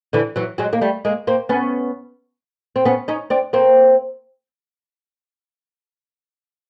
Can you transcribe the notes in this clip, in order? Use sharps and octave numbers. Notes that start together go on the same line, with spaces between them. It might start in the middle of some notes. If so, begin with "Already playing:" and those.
D3 E3
E3 F#3
F#3 G#3
A#3
G3 A3
G#3 A#3
A#3 C4
B3 C#4
C4
B3 C#4
C#4 D#4
C4 D4
A#3 C4